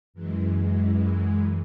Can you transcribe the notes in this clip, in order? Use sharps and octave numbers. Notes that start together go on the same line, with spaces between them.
F#2 E3 G#3